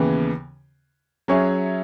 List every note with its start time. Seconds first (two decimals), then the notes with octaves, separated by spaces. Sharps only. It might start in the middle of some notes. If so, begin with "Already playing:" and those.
Already playing: D#2 C#3 E3 B3
1.28 F#3 C#4 G#4 C#5 E5